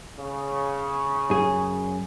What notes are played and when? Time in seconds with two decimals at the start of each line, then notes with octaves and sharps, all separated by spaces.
0.18 C#3
1.31 F#2 G#4